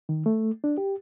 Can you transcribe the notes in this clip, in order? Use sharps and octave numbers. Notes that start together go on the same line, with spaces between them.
D#3
A3
D4
G4